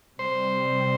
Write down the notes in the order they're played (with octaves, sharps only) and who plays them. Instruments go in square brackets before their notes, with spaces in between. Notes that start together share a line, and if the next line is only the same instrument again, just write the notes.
[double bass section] C3 G3 C4 [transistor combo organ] C5